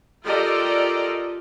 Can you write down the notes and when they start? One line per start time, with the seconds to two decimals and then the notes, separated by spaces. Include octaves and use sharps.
0.24 F4 G4 A4 A#4 D5 D#5